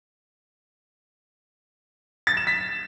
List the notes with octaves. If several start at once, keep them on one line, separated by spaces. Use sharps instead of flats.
A6
E7
B6